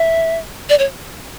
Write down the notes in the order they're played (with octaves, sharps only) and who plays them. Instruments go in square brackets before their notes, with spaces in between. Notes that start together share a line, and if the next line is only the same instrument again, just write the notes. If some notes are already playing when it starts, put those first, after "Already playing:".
Already playing: [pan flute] E5
D5
C#5